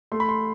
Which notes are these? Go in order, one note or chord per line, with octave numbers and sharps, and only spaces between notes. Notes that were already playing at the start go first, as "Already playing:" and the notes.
A3 C6
B5
C6